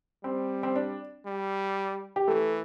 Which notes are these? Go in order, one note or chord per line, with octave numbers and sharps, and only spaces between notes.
G3 C4
C4
D4
G3
G4
E3 A3 A4